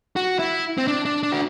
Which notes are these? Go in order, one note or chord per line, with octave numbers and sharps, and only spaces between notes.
F#4
E4
C4
D4
D4
D4
F#4